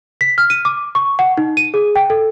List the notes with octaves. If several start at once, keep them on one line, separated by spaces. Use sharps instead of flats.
B6
F6
D#7
D6
C#6
F#5
D#4
D#7
G#4
G5
A4